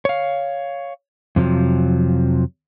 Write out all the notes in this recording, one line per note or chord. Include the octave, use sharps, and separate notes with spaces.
C#5 F5
F2 C3 F3 F#3